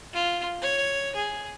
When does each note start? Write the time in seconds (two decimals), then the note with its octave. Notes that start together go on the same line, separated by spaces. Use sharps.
0.13 F4
0.62 C#5
1.15 G#4